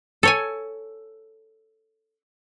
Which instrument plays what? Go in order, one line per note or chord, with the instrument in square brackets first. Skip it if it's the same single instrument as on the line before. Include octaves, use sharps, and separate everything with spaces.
[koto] A4 C#5 G#5